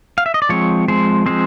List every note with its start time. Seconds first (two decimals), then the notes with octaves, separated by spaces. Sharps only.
0.18 F5
0.26 E5
0.34 D#5
0.42 D5
0.49 F3 G#3 C4 C#5
0.88 F3 G#3 C4 C5
1.26 F3 G#3 C4 C5